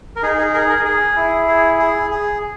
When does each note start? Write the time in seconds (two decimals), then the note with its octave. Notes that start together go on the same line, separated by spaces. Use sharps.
0.16 A#4
0.23 D#4 G#4
0.38 G#4
0.54 G#4 A#4
0.69 A#4
0.85 G#4
1.16 E4
1.48 G#4
1.79 G#4
2.11 G#4